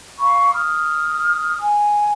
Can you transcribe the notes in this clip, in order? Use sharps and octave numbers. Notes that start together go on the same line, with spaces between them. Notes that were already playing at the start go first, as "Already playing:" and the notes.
F5 B5 C#6
D#6 F6
G#5